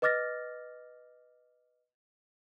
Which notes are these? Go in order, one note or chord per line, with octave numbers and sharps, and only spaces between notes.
B4 D#5 D6 F6 A6 A#6